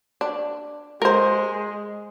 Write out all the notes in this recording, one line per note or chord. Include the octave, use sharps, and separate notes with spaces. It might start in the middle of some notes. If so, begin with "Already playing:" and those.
D4
G#3 A#4 C5